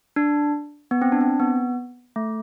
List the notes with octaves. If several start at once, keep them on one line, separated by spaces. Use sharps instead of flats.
D4
B3
C4
D4
C4
B3
A3